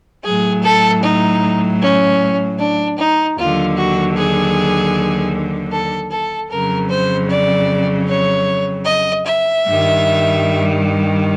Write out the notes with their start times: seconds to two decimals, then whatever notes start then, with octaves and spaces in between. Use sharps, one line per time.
0.24 A2 F#3 G#4
0.63 A4
1.03 D#4
1.81 C#4
2.59 D4
2.98 D#4
3.37 D#2 D3 F#3 F4
3.77 F#4
4.16 G#4
5.72 A4
6.12 A4
6.50 F2 C#3 F#3 A#4
6.90 C5
7.29 D5
8.07 C#5
8.85 D#5
9.25 E5
9.64 G2 D#3 G3